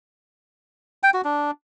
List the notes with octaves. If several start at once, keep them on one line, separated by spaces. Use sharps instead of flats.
G5
F#4
D4